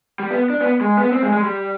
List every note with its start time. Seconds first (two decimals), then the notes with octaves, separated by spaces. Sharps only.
0.20 G3
0.31 B3
0.50 D4
0.60 B3
0.81 G#3
0.97 B3
1.12 C4
1.22 G#3
1.33 G#3
1.43 G3